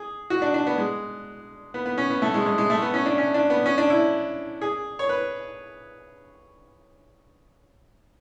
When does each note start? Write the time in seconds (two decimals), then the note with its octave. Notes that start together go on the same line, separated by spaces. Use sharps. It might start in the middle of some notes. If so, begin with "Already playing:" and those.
Already playing: G#4
0.30 F#4
0.42 D4
0.54 D4
0.67 B3
0.78 G#3
1.74 B3
1.86 B3
1.98 C#4
2.10 B3
2.22 A3
2.34 G#3
2.46 G#3
2.58 G#3
2.70 A3
2.82 B3
2.94 C#4
3.06 D4
3.18 C#4
3.34 D4
3.50 B3
3.66 C#4
3.78 D4
3.90 E4
4.61 G#4
4.99 C#5
5.09 B4